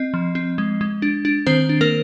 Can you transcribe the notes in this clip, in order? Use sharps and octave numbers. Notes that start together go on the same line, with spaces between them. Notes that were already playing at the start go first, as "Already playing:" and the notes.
Already playing: C4 D#5
F3
C4
G#3
G#3
D4
D4
D#3 C4 C5
D4
A#3 A#4